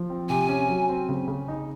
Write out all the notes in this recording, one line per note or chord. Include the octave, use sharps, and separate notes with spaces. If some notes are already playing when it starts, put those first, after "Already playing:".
Already playing: F3
C4
C3 G#5
C#4
F#3
C4
C#3
C#3
D#4